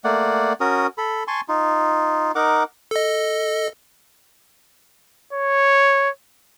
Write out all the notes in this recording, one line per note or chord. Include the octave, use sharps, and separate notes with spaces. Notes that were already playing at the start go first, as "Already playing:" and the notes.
A3 A#3 D5 F#5
C#4 F#4 A#4 D#6
A4 B5
G#5 A5 C6 C#6
D#4 F4
D#4 A#4 F#5 D6
A4 D#5
C#5